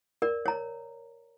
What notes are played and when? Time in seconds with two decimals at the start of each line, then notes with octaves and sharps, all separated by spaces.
0.22 A#4 D5
0.46 C#5 A#5